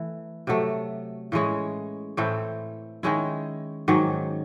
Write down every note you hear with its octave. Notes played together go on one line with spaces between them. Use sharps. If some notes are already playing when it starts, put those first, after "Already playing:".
Already playing: E3 A3 E4
C3 F#3 A3
A2 E3 G#3 C#4
A2 E3 A3 C4
D#3 G#3 C#4 E4
G#2 D#3 F#3 C#4